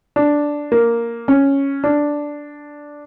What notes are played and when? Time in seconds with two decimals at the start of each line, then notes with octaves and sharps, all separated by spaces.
0.16 D4
0.72 A#3
1.28 C#4
1.84 D4